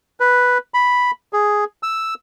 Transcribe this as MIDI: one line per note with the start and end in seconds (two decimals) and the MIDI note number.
0.20 0.58 71
0.74 1.11 83
1.33 1.64 68
1.83 2.14 88